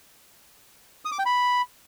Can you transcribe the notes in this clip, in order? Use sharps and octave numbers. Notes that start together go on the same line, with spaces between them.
D#6
D6
G5
B5